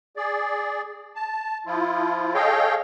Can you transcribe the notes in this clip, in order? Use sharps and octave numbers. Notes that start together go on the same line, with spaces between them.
G#4 D5
A5
F3 E4 F4
G#4 A4 C#5 D#5 F5 G5